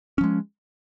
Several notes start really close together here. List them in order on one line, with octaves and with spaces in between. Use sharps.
C#4 F3 G#3